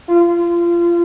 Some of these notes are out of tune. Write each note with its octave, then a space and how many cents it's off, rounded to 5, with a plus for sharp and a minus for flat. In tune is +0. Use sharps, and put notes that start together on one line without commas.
F4 -25